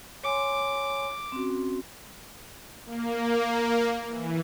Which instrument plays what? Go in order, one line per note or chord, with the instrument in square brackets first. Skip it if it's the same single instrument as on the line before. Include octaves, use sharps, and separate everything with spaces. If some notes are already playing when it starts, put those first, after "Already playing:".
[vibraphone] C#5 G#5 C6 [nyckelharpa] D6
[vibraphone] C4 C#4 F#4
[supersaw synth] A#3
E3